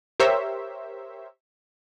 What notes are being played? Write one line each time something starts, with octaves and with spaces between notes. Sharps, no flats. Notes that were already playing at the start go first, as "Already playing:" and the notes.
G4 A#4 C5 C#5 E5